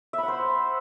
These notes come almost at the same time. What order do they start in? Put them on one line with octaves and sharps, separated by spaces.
E5 B5 F#5 C5